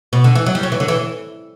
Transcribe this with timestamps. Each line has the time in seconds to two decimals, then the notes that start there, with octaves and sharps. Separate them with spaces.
0.13 B2
0.24 D3
0.35 E3
0.46 F#3
0.55 G3
0.63 F#3
0.72 E3
0.80 D3
0.88 E3